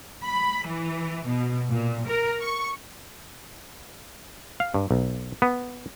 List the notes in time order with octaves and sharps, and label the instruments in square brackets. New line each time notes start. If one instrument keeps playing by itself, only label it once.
[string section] B5
E3
B2
A#2
A#4
C#6
[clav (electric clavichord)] F5
G2
B1
B3